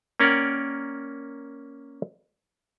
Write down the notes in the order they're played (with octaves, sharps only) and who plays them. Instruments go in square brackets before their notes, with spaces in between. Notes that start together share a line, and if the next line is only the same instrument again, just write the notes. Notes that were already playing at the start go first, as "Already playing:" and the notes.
[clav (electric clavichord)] A#3 C#4 A#4 D5 F#5 G5